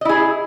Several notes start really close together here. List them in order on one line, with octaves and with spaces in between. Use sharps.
D#5 E4 G#4